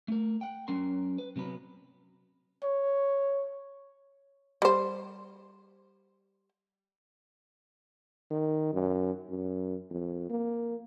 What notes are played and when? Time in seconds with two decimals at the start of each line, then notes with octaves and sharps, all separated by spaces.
0.08 A3 A#4
0.41 F#5 G5
0.68 F#3 C#4 A#4 C6
1.18 B4
1.36 C3 F#3 B3 B4
2.64 C#5
4.62 G3 C5
8.31 D#3
8.73 F#2
9.30 F#2
9.90 F2
10.30 A#3